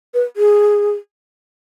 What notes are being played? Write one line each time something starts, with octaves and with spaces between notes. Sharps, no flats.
B4
G#4